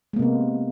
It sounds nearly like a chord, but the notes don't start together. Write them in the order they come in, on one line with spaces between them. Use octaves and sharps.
G#3 A#3 C3 B3